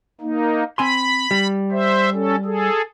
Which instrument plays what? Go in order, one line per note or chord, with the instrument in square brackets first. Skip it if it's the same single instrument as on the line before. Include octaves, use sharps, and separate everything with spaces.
[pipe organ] A#3 D#4
[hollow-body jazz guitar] C4 G#5 C6 [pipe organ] B5
[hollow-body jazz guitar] G3
[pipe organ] C5 E5
C#4 A4
G#4 A4